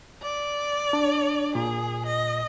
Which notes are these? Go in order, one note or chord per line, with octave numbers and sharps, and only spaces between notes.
D5
D4
A#2 G#4
D#5